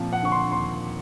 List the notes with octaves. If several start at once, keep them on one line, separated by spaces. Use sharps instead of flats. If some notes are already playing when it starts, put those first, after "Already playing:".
Already playing: A#2 F3 C4
F#5
D3 C#6
C6
D#2 C6